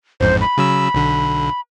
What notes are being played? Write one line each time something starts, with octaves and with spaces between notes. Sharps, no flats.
A1 F2 G#2 C5
B5
C#3 F#3 E6
B1 D3